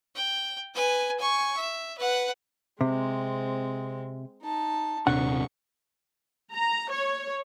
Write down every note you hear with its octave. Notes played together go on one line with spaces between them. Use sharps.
G5
B4 G#5
G#5 C#6
E5
B4 F#5
C3 G#3 C4
D#4 A5
D#1 C3 D4 F#5 C#6
A#5
C#5